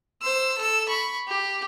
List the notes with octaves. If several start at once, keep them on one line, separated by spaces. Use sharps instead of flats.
C5 E6
A4 E6
B5 C#6
G4